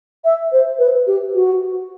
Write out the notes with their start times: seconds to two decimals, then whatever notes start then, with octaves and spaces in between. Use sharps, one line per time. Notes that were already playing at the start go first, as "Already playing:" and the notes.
0.24 E5
0.51 C5
0.78 B4
1.06 G4
1.34 F#4